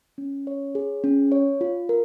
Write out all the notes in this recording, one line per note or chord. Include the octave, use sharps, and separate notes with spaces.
C#4
C#5
G#4
C#4
C#5
F4
A#4